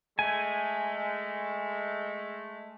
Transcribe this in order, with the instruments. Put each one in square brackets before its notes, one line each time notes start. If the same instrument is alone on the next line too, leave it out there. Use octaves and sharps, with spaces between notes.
[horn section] G#3 A3 [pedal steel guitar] G#5